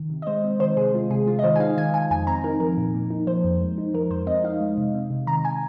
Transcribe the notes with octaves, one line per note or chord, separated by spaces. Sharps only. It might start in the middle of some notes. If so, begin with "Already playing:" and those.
Already playing: D#3
C3
D#5
G#3 C5
C4
D#3 C5
C3 G#4
G#3 F4
C3 G#4
G#3 F4
D#5
D#3 C5
G#5
D#4 F5
D#3 G#5
D#3 G#5
F2 G#5
C4 A#5
D#4 A#4
F3 A#4
A#2
A#3
D#4
F3 C5
F2
G#3
D#4
F3 A#4
F2 C5
C4 D#5
D#4 F5
G#3
C3
C4
C3
D#3 A#5
G#5